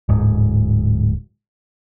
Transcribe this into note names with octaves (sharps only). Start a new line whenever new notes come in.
D1 G#2